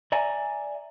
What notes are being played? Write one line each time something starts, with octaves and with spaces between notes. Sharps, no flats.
D5 E5 G#5 A#5